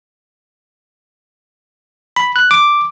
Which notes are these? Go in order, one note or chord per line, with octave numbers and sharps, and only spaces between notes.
B5
F#6
D6